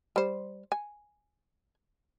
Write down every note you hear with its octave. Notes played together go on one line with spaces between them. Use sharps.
G3 C5
G#5